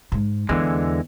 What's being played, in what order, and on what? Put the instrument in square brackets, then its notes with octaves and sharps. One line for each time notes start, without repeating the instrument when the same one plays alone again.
[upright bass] G#2
[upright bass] E2 [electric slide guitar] D3 E3 G#3